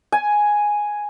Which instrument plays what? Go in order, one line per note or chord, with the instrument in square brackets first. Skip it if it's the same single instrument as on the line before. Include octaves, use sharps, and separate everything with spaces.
[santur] G#5